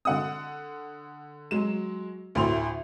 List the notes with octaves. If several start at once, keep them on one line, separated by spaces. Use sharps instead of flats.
D3 F#5 D#6
F#3 G#3 E7
D2 A2 C6 F7